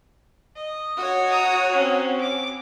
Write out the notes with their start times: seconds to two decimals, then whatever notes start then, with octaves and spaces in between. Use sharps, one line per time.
0.56 D#5
0.97 F#4 C#5
1.30 A#5 D#6
1.72 C4 C#4
2.21 D6